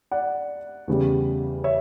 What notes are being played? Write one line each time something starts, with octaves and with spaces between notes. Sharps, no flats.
D5 F#5
E2 C#3 G3
C#5 E5